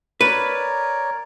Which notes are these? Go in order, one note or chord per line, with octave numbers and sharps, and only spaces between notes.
A#4 B4 C#5 D5